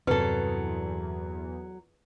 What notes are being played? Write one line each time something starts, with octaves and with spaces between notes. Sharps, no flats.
E2 G2 C3 F#3 C4 A4 B4